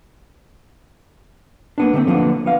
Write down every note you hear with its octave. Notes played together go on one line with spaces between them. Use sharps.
A#3 B3 D4
D3 A3 C4
D3 F3 A#3 B3
B3 F5